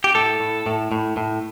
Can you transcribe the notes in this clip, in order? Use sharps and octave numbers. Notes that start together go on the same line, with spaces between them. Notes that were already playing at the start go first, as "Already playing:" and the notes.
G4
A2 A4
A2
A2
A2
A2